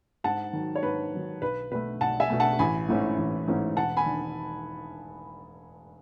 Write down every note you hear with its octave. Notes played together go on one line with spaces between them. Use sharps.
G#2 F#5 A5
D#3 F#3
C#5
G#2 B4
D#3 F#3
B1 B4
B2 A3 B4
B1 F#5 A5
E5 G#5
B2 A3
F#5 A5
A1 G#5 B5
G#2 E3 A3 C#4
A1
G#2 E3 A3 C#4
E1 F#5 A5
G#5 B5
D#3